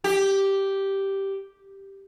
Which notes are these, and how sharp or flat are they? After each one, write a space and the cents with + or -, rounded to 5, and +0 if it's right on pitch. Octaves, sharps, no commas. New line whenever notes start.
G4 -5